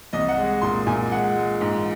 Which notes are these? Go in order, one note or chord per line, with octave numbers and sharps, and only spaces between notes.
C2 D#5
F#5
G#3
A#2 C6
A#2 G#5
G#3 F#5
G#3
G#2